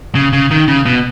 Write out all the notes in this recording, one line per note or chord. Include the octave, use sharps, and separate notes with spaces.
C#3
C#3
D#3
C#3
B2